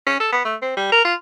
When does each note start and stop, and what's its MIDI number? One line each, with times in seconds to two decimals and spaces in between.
0.06 0.18 61
0.20 0.30 69
0.32 0.41 59
0.45 0.56 57
0.62 0.73 60
0.77 0.91 55
0.92 1.03 70
1.05 1.14 65